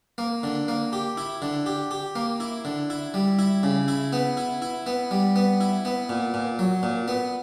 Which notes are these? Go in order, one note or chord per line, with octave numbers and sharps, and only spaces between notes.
A#3
D3
A#3
G4
E4
D3
G4
G4
A#3
E4
D3
E4
G3
E4
C#3
E4
B3
E4
E4
B3
G3
B3
E4
B3
A#2
A#2
F#3
A#2
B3